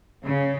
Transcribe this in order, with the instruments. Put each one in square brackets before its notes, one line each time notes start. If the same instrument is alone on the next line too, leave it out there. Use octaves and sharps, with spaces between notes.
[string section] C#3